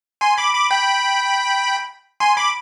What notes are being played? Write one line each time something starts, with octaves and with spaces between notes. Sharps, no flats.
G#5 C6
B5 D6
B5 D6
G5 B5
G#5 C6
B5 D6